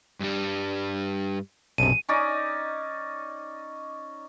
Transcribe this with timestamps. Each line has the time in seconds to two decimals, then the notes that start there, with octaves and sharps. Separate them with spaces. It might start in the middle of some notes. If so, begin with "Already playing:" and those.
0.20 G2 G3
1.78 B1 F#2 C3 D#7
2.09 C#4 D#4 D5 D#5